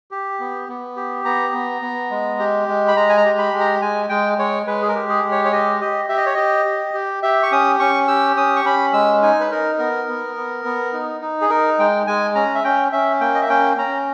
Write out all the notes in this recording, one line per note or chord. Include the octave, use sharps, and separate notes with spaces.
G4
B3
B3
G4
B3 A#5
B3
B3
G#3
G4
G#3
B5
G#3 A#5
G#5
A#5
G4
B5
G#3
A#5
G#3 G#5
G#3 G5
G#3 C#5
G#3 B4
G#4
A#4
G4
G#4
G#3
C#5
C#5
G4 D#5
G4 D#5
G4 E5
D#5
C#5
G4 D#5
G4
G4
G4 E5
C#6
C#4 D#6
C#4 C#6
G4 E6
C#4 D#6
C#6
C#4 B5
G#3 E6
D#4 G#5
B4
D#4 A#4
B3 A#4
B3
B3
B3
D#4
D#4
G#4
D#4 A#4
G#3 G5
G#3 G#5
C#4 A#5
E5
C#4 G5
C#4 E5
A#3 G5
D#5
E5
C#4 G5
C#4 A#5